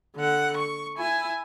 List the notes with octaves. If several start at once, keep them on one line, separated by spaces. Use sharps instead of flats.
D3 F#5
C#6
E4 G#5